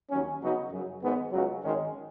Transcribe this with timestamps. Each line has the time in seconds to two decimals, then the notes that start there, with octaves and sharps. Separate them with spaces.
0.10 D#2 D#3 F#3 C#4
0.41 C#3 F#3 B3 D#4 F#4
0.71 F#2 C#3 F#3
1.01 G#1 G#2 G#3 B3
1.32 C#2 C#3 F#3
1.63 G#1 G#2 D#3 G#3 C#4